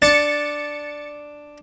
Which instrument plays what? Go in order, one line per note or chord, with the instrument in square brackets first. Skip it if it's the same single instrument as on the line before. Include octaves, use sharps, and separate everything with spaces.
[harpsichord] D4 [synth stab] A6 C#7